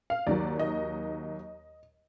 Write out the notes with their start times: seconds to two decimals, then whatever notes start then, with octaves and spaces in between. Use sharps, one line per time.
0.10 F5
0.27 D#2 D#3 F#3 D5
0.59 D#5